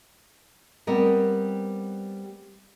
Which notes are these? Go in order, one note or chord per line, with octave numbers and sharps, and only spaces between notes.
G3 B3 C4 A#4